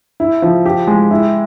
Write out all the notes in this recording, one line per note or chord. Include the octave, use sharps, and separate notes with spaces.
E4
F3
G4
G#3
E4